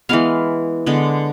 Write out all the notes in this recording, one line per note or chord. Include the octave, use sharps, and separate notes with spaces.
E3 G#3 B3 F5
D3 G#3 B3